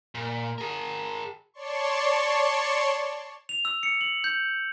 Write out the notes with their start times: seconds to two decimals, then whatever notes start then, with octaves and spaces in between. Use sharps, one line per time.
0.15 A#2
0.58 G#4 A#4
1.54 C#5 D5 A5 C6 C#6
3.49 F7
3.65 E6
3.83 C#7
4.01 F#7
4.24 G6